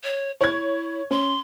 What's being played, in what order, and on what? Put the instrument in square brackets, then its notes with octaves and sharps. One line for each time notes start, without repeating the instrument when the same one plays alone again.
[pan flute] C#5
[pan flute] E4 [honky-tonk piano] C#5 G#6
[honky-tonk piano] C#4 [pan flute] C6